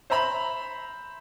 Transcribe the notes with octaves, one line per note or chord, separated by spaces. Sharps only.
C5 E5 A#5 B5